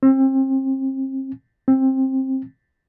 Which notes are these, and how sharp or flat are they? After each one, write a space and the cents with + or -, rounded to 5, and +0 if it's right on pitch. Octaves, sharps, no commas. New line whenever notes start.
C4 +30
C4 +15